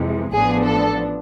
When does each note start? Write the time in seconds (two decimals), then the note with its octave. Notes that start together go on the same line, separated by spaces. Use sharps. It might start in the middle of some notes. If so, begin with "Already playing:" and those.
Already playing: F2 C3 E3 G#3
0.32 A1 A2 F3 B3 D4 G#4
0.66 A4